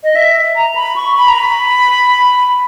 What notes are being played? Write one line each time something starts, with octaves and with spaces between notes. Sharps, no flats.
D#5
E5
A#5
B5
C#6
B5
A#5
B5